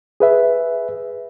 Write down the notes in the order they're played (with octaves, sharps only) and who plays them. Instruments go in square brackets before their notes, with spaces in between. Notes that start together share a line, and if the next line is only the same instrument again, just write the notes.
[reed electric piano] G#4 B4 E5